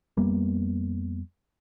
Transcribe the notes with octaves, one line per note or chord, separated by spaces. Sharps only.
F2 G3 A#3 B3